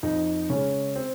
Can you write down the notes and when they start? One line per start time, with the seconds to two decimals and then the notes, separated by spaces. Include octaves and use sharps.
0.03 F2 D#4
0.50 C#3 G#3 C#4
0.96 C4